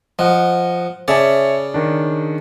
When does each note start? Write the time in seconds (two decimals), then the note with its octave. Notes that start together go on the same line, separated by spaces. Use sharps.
0.19 F3 D#5 F#5
1.08 C#3 C#5 D5 E5 A5
1.74 D#3 D4